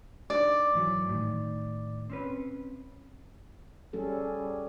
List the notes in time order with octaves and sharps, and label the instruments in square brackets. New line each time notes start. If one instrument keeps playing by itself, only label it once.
[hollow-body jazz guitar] D4 D#4 [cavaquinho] D5
[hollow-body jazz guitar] G#2 E3 F#3
A2 D#3
C4 C#4 B4
[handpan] G3 C#4 G#4 A4